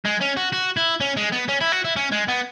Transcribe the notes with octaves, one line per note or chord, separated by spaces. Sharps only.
G#3
C#4
F#4
F#4
E4
C#4
G#3
B3
C#4
E4
F#4
E4
C#4
G#3
B3